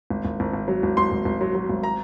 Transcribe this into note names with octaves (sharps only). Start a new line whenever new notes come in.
G#1
G#1
G#1
G#1
F#3
G#1
G#1 C6
G#1
G#1
F#3
F#3
G#1
A#5